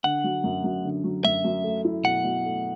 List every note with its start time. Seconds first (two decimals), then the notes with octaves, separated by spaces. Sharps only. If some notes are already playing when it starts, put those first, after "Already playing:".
0.04 D3 F#5
0.24 F#3
0.44 F#2
0.64 F#2
0.84 D3
1.04 F#3
1.24 F#2 E5
1.44 F#2
1.63 A3
1.85 E4
2.04 B2 F#5
2.24 B2
2.44 A3